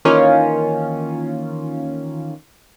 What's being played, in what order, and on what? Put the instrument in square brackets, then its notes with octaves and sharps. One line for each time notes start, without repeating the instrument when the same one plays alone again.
[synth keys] D#3 E3 A#3 C#4 F4